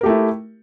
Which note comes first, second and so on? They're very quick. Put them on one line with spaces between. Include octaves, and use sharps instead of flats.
A#4 G4 A3 E4